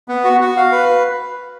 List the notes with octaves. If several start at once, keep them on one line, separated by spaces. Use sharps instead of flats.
B3
F#4
F#4
F5
B4